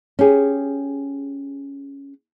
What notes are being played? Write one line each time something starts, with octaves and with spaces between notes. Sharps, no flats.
C#4 G4 G#4